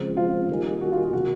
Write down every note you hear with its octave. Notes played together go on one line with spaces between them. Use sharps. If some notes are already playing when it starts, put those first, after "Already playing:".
Already playing: C#3 F3 G#3 C4
F4
D#3 G3 A#3 D#4 G#4
F#4
F4
F4
C3 D#3 F#3 A#3 F#4